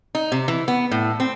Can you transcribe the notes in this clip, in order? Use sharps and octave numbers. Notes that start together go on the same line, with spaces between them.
D#4
C3
E3
B3
A2
C4